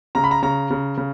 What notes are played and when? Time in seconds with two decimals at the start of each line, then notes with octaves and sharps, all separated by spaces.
0.15 C#3 A#5
0.24 B5
0.31 A#5
0.42 C#3 A#5
0.71 C#3
0.97 C#3